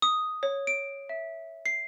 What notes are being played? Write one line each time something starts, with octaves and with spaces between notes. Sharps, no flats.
D#6
C#5
D7
E5
C7